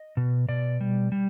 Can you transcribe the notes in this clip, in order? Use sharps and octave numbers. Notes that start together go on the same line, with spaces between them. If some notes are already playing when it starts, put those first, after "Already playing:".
Already playing: D#5
B2
B2 D5
G3
G3